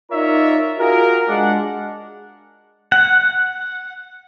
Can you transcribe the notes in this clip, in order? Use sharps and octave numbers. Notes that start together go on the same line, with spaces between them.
D#4 F4 A#4 C#5 D5 E5
F4 F#4 G#4 A#4
G#3 D4 F#5
F#5